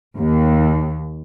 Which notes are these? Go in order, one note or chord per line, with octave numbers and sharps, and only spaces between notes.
D#2